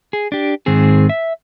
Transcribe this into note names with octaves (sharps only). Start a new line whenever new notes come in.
G#4
D4 G4
G#2 D#3 C4 G#4
E5